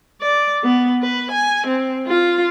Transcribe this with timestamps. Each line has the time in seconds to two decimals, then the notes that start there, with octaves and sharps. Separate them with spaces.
0.21 D5
0.64 B3
1.02 B4
1.31 G#5
1.67 C4
2.07 F4